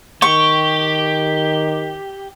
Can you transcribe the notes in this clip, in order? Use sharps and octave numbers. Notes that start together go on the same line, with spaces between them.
D#3 G4 C#6